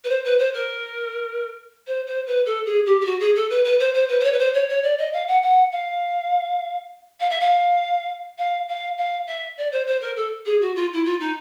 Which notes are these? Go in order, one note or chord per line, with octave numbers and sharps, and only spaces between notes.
B4
C5
B4
C5
A#4
C5
C5
B4
A4
G#4
G4
G4
F#4
G#4
A4
B4
B4
C5
C5
B4
C5
C#5
B4
C5
C#5
C#5
D5
D#5
F5
F#5
F#5
F5
F5
E5
F5
F5
F5
F5
E5
D5
C5
C5
A#4
A4
G#4
F#4
F4
E4
F4
D#4